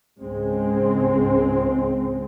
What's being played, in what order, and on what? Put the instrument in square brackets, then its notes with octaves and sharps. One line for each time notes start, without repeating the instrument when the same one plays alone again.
[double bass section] C#2 G#2 G#3 C4